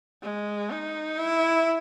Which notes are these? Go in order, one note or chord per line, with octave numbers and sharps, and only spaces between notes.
G#3
D#4
E4